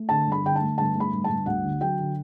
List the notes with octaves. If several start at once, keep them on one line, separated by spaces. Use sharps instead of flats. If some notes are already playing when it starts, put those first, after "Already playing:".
Already playing: A3
D3 A5
G1
B5
D3 G5
A3 A5
G1 A5
A3
B5
G1
A5
G1
D2 F#5
D3
F#3 G5
D3